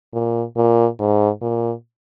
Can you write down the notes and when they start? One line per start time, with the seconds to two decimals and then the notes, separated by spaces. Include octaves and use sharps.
0.13 A#2
0.56 A#2
0.99 G#2
1.42 A#2